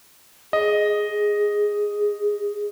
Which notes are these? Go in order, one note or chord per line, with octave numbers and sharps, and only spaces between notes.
G#4 D#5